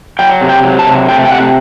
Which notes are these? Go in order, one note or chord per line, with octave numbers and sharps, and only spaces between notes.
F#3 G5
C3
G5
F#3
A5
C3
A3 G5
G5
C3 F#5